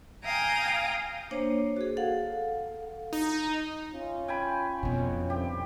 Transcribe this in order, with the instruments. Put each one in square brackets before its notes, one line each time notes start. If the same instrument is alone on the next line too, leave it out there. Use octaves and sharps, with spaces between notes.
[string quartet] F5 G5 G#5 A#5 D#6
[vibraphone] A#3 D4 C5 C#5
F#4 G#4
A4 F5 F#5
[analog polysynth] D#4
[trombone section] C#4 F4
[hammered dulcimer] G5 G#5 B5
[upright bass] F2 B2
[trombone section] C2 D3 C4 [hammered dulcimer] G4